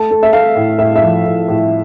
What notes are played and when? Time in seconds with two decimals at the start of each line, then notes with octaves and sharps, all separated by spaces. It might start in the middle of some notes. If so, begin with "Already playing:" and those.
Already playing: A3 A5
0.11 A3
0.23 E5
0.33 A3 F5
0.56 A2
0.79 A2 E5
0.96 E5
1.03 F3
1.26 A2
1.48 A2